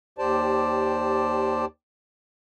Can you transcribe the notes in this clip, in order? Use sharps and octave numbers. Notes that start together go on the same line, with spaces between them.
D#2 G4 C5 D5 A5